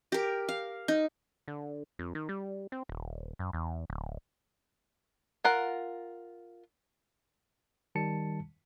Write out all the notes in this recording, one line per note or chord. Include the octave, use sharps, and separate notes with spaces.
G4 A#4
F5
D#4
D3
F2
D#3
G3
C4
D#1
F#2
E2
D1
F4 A#4 F#5
D#3 G3 A5 C#7